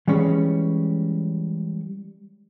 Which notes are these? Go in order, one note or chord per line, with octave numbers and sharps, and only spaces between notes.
E3 G3 G#3 C#4